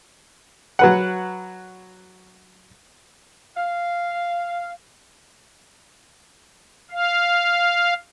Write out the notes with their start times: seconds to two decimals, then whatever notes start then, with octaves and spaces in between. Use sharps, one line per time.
0.79 F#3 B4 F#5
3.57 F5
6.91 F5